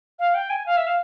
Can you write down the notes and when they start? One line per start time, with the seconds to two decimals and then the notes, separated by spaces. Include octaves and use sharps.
0.19 F5
0.34 G5
0.50 G#5
0.66 F5
0.77 E5
0.87 F5